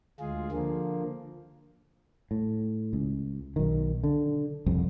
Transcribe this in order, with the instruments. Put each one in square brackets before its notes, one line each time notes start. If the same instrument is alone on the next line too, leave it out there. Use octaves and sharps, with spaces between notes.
[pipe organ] D2 G#3 F4 G#4
D3 F3 A#3
[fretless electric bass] A2
C#2
B1 D#3
D3
C2 F2